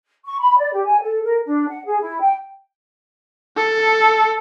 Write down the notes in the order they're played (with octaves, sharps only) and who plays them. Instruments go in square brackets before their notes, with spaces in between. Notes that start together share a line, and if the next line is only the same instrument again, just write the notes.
[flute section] C#6
B5
D5
G4
G#5
A4
A#4
D4
F#5
G#4
E4
G5
[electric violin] A4